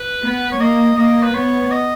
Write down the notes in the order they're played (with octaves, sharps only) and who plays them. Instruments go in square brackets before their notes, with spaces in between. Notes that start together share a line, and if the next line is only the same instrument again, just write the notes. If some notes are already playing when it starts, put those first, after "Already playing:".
Already playing: [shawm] B4
[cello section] B3
[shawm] C#5
[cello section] A#3 [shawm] D#5
[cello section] A#3 [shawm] D#5
[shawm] B4
[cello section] B3 [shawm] C#5
[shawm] D#5